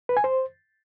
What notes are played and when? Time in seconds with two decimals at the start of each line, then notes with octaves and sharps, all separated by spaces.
0.09 B4
0.17 G#5
0.24 C5